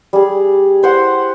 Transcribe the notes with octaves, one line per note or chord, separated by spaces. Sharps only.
G3 G#4
E4 C5 F#5